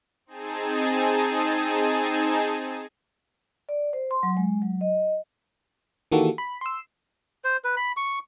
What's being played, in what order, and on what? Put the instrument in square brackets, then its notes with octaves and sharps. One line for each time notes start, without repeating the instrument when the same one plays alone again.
[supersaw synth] C4 D#4 G#4 G#5 A5
[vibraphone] D5
C5
C6
F#3
G#3
F#3
D#5
[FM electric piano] D#3 E3 A#3 F#4 G4 A4
B5
C6 E6
[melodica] C5
B4
B5
C#6